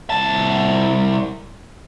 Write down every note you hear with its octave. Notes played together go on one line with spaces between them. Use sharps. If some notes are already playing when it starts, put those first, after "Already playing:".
C2 A5